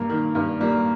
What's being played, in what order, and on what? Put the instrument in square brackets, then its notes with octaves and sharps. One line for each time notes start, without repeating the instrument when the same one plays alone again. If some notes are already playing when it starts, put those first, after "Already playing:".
Already playing: [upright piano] G2 [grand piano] A#3
[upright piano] D#3
G2
[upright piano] G3 [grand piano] A#3